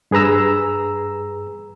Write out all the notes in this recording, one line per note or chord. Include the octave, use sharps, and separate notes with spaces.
G2 G#4 B4 A#5 E6